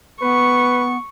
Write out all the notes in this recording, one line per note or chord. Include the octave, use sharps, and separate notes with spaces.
B3 B4 C#6